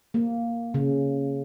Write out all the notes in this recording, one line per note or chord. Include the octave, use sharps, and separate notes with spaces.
A#3
C#3